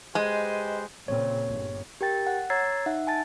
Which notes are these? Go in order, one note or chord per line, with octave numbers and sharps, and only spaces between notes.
G#3 G4 B4 C5 D#5 G#5
A#2 C#3 C4 C#5
G1
G4 A#4 G5 A6
F#5
C#5 A#5 E6 G#6 A6 C7
D#4 E5 F#5
G#5 A5 A6